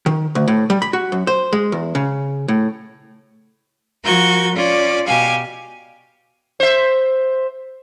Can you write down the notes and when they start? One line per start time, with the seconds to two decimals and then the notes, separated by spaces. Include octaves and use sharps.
0.06 D#3
0.35 D2
0.48 A2
0.70 G3
0.82 B5
0.93 F#4
1.12 F#2
1.27 C5
1.53 G#3
1.72 E2
1.95 C#3
2.48 A2
4.05 F3 F#4 A#4 G6 G#6
4.56 C#4 F4 D5
5.06 B2 G4 F5 G#5
6.60 C5 E5